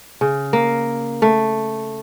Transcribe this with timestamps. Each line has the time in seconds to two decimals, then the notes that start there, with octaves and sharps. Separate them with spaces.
0.21 C#3
0.53 A#3
1.22 A3